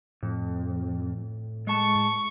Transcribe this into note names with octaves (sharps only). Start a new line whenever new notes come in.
F2 A2
G#3 A5 C#6